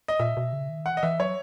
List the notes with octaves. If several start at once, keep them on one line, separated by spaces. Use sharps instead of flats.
D#5
A#2 E5
B2
C#3
D#3
E3 F#5
D#5
E3 E5
F#3 C#5